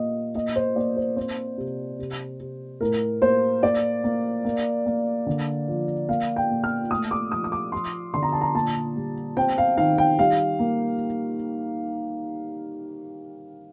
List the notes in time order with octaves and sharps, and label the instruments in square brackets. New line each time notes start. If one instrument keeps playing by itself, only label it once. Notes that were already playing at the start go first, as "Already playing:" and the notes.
Already playing: [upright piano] A#2 A#3 D#5
A#2 D#5
C5
A#3 D5
C5
C4 C5
C3
C3
C3
A2 A#4
A#3 C5
A#3 D5
A#3
A#3
A#3
D3
F3
A#3 F5
G5
A#2
F6
A3 D#6
D6
F3 D#6
D#6
D6
F3 C6
D3 C6
A#5
A5
A#5
A#2 A5
G3
C4 G5
F5
D#3 F5
G5
G3 F5
A#3